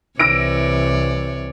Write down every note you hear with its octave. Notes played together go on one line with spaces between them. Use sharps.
C2 C3 E3 C#5 D5 E6 A#6 D7